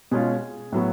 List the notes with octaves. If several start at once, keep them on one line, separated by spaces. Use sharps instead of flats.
B2 G#3 C#4 F4 G#4
A2 F#3 B3